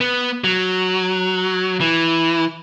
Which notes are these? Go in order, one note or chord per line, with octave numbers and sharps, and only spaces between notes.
B3
F#3
E3